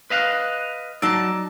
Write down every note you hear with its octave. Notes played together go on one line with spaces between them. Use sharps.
B4 D#5 F5 F#6
F#3 D#4 D5 A5 E6